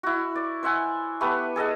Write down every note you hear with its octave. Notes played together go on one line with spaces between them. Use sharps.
E4 F#4
D5
C5 E5 F#5 G#5
A3 B3 G4 B4
G#4 A4 D#5 F#5